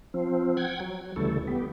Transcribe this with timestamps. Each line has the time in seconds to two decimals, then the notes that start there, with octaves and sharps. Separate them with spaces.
0.14 F3 C4
0.57 F#5 G5 G#6
0.80 F#3
1.16 D2 C#3 E3 G3 A3 A4
1.47 B3 G4